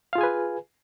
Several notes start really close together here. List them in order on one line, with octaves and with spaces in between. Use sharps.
F5 F4 G#4 G#5 B4